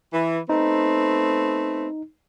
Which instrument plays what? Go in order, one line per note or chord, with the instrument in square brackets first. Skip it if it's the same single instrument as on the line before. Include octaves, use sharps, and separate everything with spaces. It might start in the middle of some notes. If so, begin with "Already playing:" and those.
[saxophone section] E3
[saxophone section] A3 B3 C4 [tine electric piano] D#4